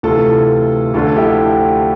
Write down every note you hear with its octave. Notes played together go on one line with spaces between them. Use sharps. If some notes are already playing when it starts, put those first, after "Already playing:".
D2 C3 E3 F4 A4
D2 D3 F3 F4 A4
E4 G4